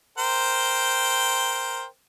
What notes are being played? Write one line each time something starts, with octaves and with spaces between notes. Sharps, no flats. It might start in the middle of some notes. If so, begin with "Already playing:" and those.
A#4 C5 G5